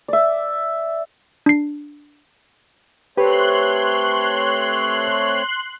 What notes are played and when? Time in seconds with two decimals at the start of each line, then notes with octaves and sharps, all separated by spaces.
0.08 D5 E5
1.46 D4 C7
3.17 A3 C4 G4 B4 C#5 C6 F#6